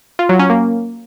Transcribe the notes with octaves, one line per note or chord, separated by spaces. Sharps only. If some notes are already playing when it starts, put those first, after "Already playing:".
F4
F#3
C#4
A#3